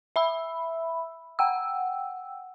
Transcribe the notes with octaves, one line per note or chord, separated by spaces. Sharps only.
E5 B5 E6
F#5 G5 E6